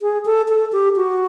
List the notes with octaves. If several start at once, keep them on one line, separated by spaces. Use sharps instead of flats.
G#4
A4
A4
G4
F#4